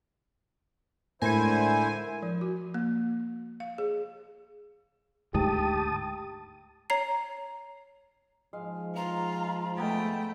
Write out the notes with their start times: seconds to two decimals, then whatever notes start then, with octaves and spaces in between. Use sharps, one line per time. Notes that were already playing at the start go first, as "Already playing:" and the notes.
1.22 A2 D3 G#3 E4 A#4 C5 G#5
2.23 F3
2.41 F#4
2.74 A#3
3.60 F5
3.78 G#4
5.34 D2 G#2 G4 A5 D#6
6.90 C#5 A#5 C7
8.53 G#2 F3 G#3 F5
8.96 F4 A#5
9.78 G#3 A3 B3 G5